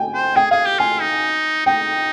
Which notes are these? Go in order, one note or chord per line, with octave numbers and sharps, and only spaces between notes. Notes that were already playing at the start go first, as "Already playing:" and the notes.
Already playing: G5 G#5
C5
G#4 G5
G#4 F5
G4
F4 G#5
D#4
D#4 G5